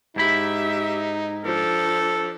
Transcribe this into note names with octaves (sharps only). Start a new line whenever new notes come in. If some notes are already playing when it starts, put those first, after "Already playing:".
G#2 D#4 E4 G4 E5 B5
F3 D4 A4